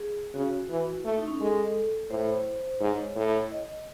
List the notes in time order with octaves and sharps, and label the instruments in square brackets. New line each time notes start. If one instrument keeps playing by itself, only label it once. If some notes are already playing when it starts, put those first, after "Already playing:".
Already playing: [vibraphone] G#4
[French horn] C#3 [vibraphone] F#4
[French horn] E3
[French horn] A3 [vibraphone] E4
[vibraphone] D#4
C#4
[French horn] G#3 [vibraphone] A4
[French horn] A2 [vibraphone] C5
[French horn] G#2 [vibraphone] C#5
[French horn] A2
[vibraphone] D#5